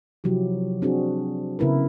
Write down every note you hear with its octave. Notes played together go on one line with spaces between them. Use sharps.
C3 F3 F#3 E4 G4
C4 D4 F#4 G#4
C#3 B3 E4 A#4 B4